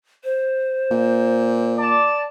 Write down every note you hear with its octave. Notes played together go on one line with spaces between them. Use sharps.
C5
A#2
D5 A5